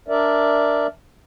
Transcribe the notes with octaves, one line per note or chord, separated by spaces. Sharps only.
D4 A#4 D5 E5